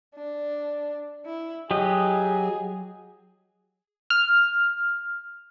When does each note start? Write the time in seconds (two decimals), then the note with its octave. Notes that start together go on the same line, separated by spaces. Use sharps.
0.15 D4
1.25 E4
1.71 F#3 G4 G#4 D#5
4.10 F6